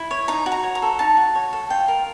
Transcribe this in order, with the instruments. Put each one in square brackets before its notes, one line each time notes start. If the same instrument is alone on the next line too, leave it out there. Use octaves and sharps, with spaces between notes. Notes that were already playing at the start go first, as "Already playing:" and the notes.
Already playing: [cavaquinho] E4
C#5
D#4 A#5
F#4
A#5
C#5
A#5
A4
D#4 A5
F#4
C#5
A4
F4 G5
A#4